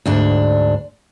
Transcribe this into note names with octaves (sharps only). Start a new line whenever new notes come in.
D2 G#2 D4